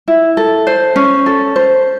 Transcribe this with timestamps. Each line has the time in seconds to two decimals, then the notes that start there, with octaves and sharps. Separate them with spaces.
0.08 E4
0.37 A4
0.67 C5
0.96 C#4
1.26 A4
1.56 C5